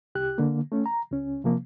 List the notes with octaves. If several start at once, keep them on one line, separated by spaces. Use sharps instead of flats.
C2 G4 F#6
D3 A#3
A3 C#4
A#5
C#2 C#4
C3 F3 A#3